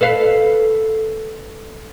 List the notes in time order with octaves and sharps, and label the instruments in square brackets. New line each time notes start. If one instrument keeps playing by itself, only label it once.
[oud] A4 B4 F5